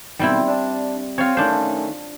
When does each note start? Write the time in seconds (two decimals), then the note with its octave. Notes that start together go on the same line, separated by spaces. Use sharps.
0.19 B2 D#3 G3 C4 E4
0.48 D4
1.18 C4 F4 C#5
1.37 D#3 A3 C#4 D4 C5